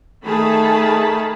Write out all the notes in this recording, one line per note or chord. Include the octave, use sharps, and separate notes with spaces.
D#3 A3 G#4 A5 B5